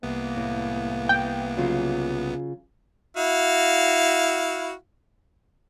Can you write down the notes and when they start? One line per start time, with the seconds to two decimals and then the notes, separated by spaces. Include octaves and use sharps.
0.03 C2 E3 A#3 B3
0.37 A2
1.09 G5
1.57 C#3 F#3 F4
3.17 E4 F#4 F5